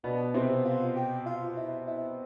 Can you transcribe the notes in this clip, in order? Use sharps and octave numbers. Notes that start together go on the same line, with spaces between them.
B2 B3 D4
C3 C4 E4
F4
G4
F4
E4
E4